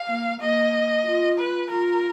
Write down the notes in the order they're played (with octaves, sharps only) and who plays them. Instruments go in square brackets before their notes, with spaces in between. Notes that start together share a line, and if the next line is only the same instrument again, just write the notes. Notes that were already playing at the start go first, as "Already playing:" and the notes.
Already playing: [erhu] F5
[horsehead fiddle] A#3
[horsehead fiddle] A#3 [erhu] D#5
[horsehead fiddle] F4
[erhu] B4
[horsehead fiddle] F4 [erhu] A#4